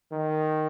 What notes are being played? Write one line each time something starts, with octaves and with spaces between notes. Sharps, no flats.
D#3